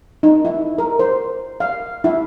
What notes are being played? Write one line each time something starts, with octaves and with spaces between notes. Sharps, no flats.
D#4
E4
A#4
C5
F5
E4